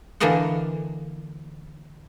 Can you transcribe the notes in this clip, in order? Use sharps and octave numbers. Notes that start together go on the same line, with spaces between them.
D3 E3 A#3 D5 D#5 F#5